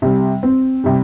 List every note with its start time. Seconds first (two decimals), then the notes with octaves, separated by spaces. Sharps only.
0.02 C3 G3
0.43 C4
0.84 C3 G3